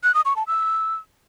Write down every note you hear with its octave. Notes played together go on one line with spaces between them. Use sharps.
F#6
D#6
C#6
A5
E6